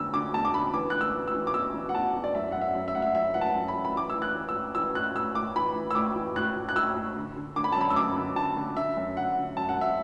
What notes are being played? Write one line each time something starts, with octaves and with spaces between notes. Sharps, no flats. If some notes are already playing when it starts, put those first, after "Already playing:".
Already playing: E2 D3 E6
D3 D6
E2 A5
D6
D3 B5
E3 D6
E3 F#6
E6
E3
E6
E3
D6
E2 E6
E3
F#5
E2 A5
E2
D5
F#2 E5
F#2 F#5
E5
F#2
E5
F#2 F#5
E5
F#2 E5
E3 F#5
A5
F#2
B5
E3
B5
E3 D6
E6
E3
F#6
E3
E6
A2
E3 E6
A2 F#6
A2 E6
A2 D6
E3 B5
E3
E6
A2 D6
E3
A2 F#6
A2
F#6
A2 E6
A2
D3
D3
D3 D6
B5
A5
F#2 B5
E6
F#2 D6
D3
D3 A5
D3
D3 E5
F#2
D3 F#5
D3
F#2 A5
F#5
F#2 E5